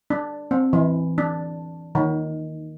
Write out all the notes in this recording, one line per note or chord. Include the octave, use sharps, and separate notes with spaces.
D4
C4
E3
D4
D#3